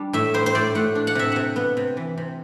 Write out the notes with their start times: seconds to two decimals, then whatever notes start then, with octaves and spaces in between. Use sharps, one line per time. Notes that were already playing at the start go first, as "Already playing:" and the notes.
Already playing: G3 D4
0.13 A2 E5
0.34 G3 C5
0.46 C5
0.55 A2 D5
0.75 A2 F#5
0.95 D4
1.07 F#5
1.15 C3 E5
1.32 C3 F#5
1.56 B3
1.77 C3
1.97 E3
2.18 C3